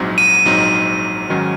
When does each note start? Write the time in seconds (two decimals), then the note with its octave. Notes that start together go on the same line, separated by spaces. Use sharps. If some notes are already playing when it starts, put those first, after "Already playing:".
Already playing: A#1 G#2 F#3 C4 D#4
0.18 D#7
0.45 A#1 G#2 F#3 C4 D#4
1.30 G#2 D#3 F#3 C#4